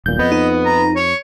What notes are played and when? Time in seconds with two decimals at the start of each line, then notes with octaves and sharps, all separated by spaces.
0.06 D#1 B1 A#2 G6
0.19 F2 B3 D#5
0.32 D#4
0.66 A#5
0.96 C#5